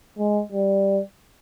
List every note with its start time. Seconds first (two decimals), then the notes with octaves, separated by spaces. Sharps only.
0.18 G#3
0.52 G3